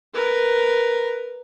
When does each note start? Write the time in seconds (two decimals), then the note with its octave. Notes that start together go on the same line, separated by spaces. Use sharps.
0.14 A#4 B4